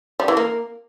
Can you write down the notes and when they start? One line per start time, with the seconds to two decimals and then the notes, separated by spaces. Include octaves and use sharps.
0.20 G3
0.28 E3
0.37 A#3